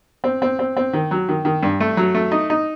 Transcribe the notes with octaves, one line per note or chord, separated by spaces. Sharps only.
C4
C4
C4
C4
D#3
F#3
D#3
D#3
G2
A3
F#3
A3
D#4
D#4